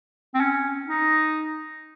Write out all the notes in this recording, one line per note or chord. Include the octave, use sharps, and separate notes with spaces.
C4
C#4
D#4